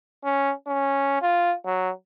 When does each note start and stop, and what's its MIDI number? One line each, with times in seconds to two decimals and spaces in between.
0.24 0.52 61
0.67 1.21 61
1.22 1.54 65
1.66 1.90 54